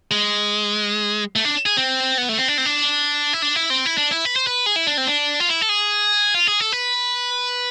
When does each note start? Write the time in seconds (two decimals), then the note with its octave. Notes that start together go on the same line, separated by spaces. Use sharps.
0.11 G#3
1.36 A3
1.45 D4
1.66 G#4
1.77 C4
2.18 B3
2.29 A3
2.38 C4
2.48 D4
2.58 C4
2.66 D4
3.33 E4
3.42 D4
3.56 E4
3.70 C4
3.86 E4
3.98 D4
4.11 E4
4.25 B4
4.36 C5
4.47 B4
4.66 G#4
4.76 E4
4.87 D4
4.98 C4
5.07 D4
5.40 F4
5.49 E4
5.61 A4
5.69 G#4
6.34 F4
6.47 G#4
6.60 A4
6.72 B4